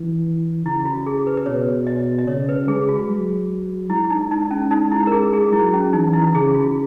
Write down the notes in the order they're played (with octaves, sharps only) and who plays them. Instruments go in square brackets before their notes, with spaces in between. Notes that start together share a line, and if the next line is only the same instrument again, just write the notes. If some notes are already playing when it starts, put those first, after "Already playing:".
Already playing: [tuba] E3
[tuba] C#3 [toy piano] E4
[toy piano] F#4
G#4
B4
B4
[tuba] B2 [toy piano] C#5
[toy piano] D#5
D#5
[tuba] C#3 [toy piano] C#5
[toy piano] B4
[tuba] G#3 [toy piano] G#4
[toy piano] F#4
[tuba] F#3
[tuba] G#3 [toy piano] E4
[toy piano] D#4
D#4
C#4
D#4
E4
A#4
G#4
G#4
[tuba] F#3 [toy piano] E4
[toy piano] C#4
[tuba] E3 [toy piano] D#4
[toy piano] E4
[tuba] C#3 [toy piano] G#4
[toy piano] F#4